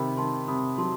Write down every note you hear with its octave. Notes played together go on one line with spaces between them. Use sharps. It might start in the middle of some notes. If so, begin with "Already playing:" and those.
Already playing: C3 D#3 G5 B5
D#3 A5 C6
C3 B5 D#6
F#3 A5 C6